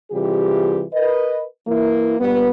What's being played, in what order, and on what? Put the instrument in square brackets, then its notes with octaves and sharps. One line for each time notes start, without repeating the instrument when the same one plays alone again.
[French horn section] C3 E3 G3 F4 G4 G#4
A#4 B4 D#5
E3 A#3 E4
G2 A#2 G3 B3